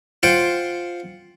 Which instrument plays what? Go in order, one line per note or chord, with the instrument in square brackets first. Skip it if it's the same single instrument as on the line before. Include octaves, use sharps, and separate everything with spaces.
[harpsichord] F4 C5 F#5 G5